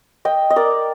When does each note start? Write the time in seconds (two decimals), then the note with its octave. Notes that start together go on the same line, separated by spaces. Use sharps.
0.25 D#5 G5
0.50 D#5
0.56 A#4 D5